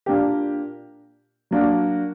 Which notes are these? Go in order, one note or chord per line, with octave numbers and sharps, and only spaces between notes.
A#2 A#3 D4 G4
F#3 A#3 D4 F#4